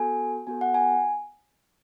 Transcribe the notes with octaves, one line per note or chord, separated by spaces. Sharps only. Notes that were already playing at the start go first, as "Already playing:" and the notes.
Already playing: B3 F#4 A4 G#5
B3 F#4 A4 G#5
F#5
G#5